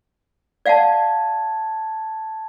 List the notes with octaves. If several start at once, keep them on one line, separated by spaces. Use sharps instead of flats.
D5 F5 F#5 A5 G#6